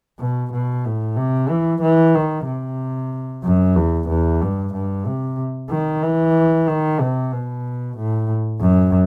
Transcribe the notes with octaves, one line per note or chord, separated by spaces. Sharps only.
B2
B2
A2
C3
E3
E3
D#3
C3
F#2
E2
E2
G2
G2
C3
D#3
E3
D#3
C3
B2
A2
F#2